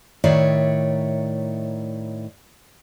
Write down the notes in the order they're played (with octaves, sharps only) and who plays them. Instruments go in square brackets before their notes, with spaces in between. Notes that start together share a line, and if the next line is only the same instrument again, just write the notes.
[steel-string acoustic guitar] A2 D#3 C#5 D5 E5